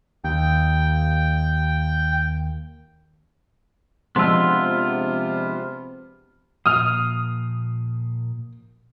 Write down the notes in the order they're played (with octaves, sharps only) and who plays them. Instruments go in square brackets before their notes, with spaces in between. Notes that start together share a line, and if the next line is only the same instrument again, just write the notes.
[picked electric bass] D#2 [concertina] G5
[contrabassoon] C3 [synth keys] F3 G#3 D4 [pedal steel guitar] B3 F4 [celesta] C6 E6
[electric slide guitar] A#2 F3 A#3 [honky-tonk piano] D#6 F6